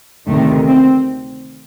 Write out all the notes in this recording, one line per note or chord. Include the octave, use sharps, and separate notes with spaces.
D2 C3 D#3 A3
C4